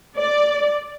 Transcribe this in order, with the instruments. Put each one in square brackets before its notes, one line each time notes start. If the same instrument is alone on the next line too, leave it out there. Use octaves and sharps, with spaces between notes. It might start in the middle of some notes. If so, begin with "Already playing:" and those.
[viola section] D5